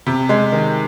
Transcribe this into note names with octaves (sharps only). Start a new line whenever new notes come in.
C3
G#3
D#3